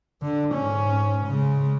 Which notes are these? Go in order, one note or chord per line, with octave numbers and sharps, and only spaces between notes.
D3
G#2 C#4
C#3 G#3